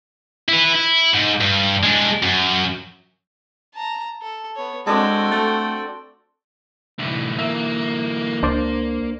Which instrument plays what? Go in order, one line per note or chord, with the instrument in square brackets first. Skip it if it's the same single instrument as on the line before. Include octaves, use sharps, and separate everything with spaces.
[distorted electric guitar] E4 B4
E4
G#2
G2
G#3 D4
F#2
[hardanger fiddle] A5 A#5
A4
B3 C#5
[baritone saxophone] G#3 [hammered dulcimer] C4 D4 A4 [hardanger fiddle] F#4 G5
[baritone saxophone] A3
[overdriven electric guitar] C2 A2 [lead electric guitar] D3 E3
[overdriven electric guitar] A#3 [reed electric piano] E5
[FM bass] C#2 [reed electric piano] D4 C5 D5